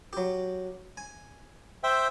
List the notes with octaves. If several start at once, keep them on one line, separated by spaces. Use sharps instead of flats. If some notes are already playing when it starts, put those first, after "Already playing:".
F#3 G4
G#5
C5 E5 G5